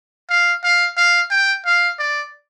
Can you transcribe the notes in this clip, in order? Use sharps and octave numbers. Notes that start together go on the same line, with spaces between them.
F5
F5
F5
G5
F5
D5